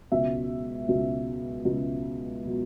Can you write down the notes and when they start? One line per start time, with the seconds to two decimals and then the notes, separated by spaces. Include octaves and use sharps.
0.12 C#2 B2 F#3 E5
0.88 C#2 B2 F#3
1.65 C#2 B2 F#3
2.44 B2 F#3